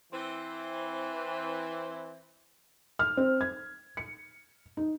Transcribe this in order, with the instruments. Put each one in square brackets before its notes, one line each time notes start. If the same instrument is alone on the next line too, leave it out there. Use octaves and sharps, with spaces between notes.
[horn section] E3 C4
[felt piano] F6
C4
G#6
C#7
D#4